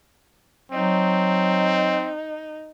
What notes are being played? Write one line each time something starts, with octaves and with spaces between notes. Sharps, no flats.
F#3 C4 D#4